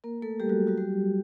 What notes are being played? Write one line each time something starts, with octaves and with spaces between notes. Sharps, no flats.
A#3 A#4
A3 A4
G3 G4
F#3 F#4
F#3 F#4
G3 G4